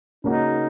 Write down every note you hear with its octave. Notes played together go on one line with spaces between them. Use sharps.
C#3 A#3 C#4 D#4 F#4